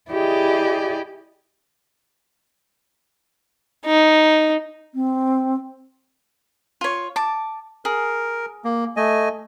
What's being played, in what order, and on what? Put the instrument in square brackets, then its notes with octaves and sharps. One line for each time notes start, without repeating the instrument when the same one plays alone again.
[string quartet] E4 G4 G#4 D5 D#5
[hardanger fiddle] D#4
[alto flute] C4
[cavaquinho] F4 C#5
A5 D6
[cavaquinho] G#4 [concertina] A#4
[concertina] A#3
A3 D#5 G#5